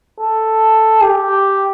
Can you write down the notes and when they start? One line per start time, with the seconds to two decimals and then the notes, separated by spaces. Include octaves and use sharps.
0.20 A4
1.02 G4